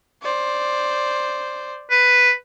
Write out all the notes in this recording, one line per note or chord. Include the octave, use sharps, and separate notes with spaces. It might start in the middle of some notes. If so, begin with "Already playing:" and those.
C5 D5
B4